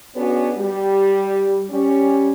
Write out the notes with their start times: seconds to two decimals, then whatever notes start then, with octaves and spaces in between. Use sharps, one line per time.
0.15 B3 C#4 D4 F#4 G#4
0.57 G3
1.70 G3 C#4